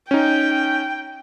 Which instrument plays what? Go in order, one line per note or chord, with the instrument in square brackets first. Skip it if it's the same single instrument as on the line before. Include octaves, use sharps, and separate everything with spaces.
[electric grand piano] C#4 D#4 [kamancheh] G5